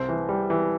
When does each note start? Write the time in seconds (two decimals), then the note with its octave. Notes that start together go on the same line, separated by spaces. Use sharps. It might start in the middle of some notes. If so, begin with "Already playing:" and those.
Already playing: C2 C5
0.09 E3
0.29 G3
0.50 E3